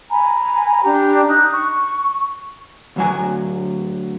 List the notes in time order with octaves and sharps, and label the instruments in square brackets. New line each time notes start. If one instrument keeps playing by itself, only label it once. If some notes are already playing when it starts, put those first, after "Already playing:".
[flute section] G#5 A#5 B5
D4 G4 A#5
D#4 F#6
C#6
[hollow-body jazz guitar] D2 F#3 G#5